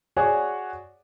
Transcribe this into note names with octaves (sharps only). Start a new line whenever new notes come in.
F#4 G#4 C#5 D5 F#5 G#5